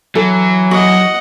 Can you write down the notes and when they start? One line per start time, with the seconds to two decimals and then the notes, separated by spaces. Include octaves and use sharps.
0.15 E3 F#3 A4
0.71 F#4 D#5 F#5